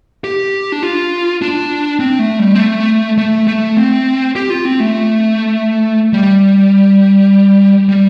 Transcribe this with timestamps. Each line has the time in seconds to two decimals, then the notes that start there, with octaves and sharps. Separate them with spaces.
0.24 G4
0.72 D4
0.83 F4
1.42 D4
2.00 C4
2.19 A3
2.39 G3
2.55 C4
2.59 A3
3.18 A3
3.47 A3
3.77 C4
4.36 G4
4.50 F4
4.65 C4
4.80 A3
6.13 G3
7.89 G3